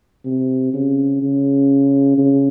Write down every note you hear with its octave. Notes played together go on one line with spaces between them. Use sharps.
C3
C#3
C#3
C#3